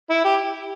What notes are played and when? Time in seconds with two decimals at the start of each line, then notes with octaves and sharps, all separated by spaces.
0.10 E4
0.25 G4